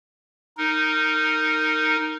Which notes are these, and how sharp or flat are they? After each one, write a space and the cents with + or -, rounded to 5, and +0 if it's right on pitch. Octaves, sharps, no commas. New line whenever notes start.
D#4 +0 A#4 -15